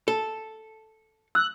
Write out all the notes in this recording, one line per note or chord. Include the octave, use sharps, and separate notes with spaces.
A4
E6 F#6